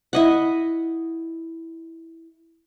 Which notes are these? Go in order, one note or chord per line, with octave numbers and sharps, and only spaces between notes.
E4 D#5 F#5